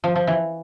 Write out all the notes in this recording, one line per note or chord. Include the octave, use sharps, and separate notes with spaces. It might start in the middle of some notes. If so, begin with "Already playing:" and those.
F3
F3
E3